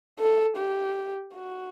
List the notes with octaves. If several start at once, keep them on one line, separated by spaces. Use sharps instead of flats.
A4
G4
F#4